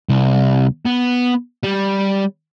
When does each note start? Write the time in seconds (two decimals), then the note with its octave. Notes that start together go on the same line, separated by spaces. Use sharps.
0.09 C2
0.86 B3
1.64 G3